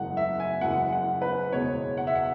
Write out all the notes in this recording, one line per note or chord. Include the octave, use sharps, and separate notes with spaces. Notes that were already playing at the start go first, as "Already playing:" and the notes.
Already playing: F#1 F#2 E3 G#3 F#5
E5
G#5
F#1 F#2 E3 G#3 F#5
F#5
B4
F#1 E2 B2 G#3 C#5
F#5
E5
F#5